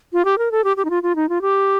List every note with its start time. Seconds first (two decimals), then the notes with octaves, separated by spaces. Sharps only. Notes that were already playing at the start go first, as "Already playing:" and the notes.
0.13 F4
0.25 G4
0.38 A#4
0.52 A4
0.64 G4
0.77 G4
0.85 D#4
0.90 F4
1.03 F4
1.16 D#4
1.29 F4
1.42 G4